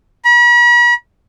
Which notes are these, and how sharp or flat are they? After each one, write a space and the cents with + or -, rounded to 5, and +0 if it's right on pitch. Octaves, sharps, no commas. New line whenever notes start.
B5 -45